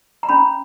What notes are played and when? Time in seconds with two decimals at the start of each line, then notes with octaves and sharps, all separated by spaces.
0.23 A#5
0.29 C#4 B5